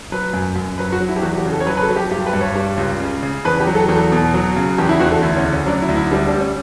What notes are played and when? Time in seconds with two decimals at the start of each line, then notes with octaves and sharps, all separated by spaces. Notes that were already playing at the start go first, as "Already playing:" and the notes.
0.12 F#3 B4
0.34 F#2
0.56 F#2
0.78 F#3 B4
0.92 F#4
1.00 F#3
1.08 E4
1.16 G4
1.22 E2 F#4
1.37 G4
1.45 C#3
1.52 A4
1.60 C#5
1.66 F#3 B4
1.77 B4
1.82 A4
1.89 F#3
1.96 G4
2.11 G2 G4
2.26 B4
2.33 G2
2.41 C#5
2.55 G3
2.77 C#2
3.00 C#3
3.23 C#3
3.45 E2 B4
3.60 G4
3.67 F#3
3.75 A4
3.88 E2 A4
4.12 B2
4.34 F#3
4.56 C#3
4.78 E2 G4
4.89 E4
5.00 E2 F#4
5.11 A4
5.22 D2 E4
5.37 C#4
5.44 C#3
5.52 C#4
5.66 F#3 D4
5.82 E4
5.88 D2
5.96 E4
6.11 G3 D4
6.26 D4
6.34 G3
6.40 C#4